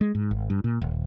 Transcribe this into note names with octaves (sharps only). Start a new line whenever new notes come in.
G#3
G#2
G#1
G2
A#2
D#1